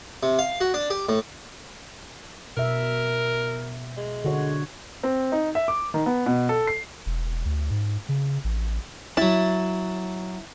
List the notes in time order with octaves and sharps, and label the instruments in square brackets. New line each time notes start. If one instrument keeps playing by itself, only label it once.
[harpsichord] C3
F5
F#4
D4
G4
A2
[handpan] B2 E5 [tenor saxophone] A#4
[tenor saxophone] G#3
[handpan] D3 F#4 C#5
[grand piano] C4
D#4
E5
D6
D#3
B3
B2
A4
C7
[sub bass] E1
D2
G#2
C#3
A1
[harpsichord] F#3 A5 [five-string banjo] E4